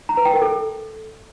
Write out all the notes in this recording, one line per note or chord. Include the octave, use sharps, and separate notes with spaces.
A#5
B4
G5
A#4
A4